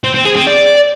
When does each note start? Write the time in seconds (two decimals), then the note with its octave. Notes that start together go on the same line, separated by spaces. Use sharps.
0.04 C4
0.15 C4
0.26 G#4
0.36 C4
0.47 D5